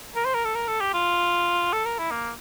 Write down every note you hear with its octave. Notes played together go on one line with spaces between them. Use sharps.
A#4
C5
A#4
A4
A#4
A4
G4
F4
A4
A#4
E4
A#3